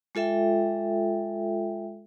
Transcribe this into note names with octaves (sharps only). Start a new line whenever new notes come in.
G#3 F4 A4 E5 G5